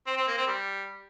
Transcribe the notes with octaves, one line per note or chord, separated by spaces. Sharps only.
C4
C4
A#3
C4
G3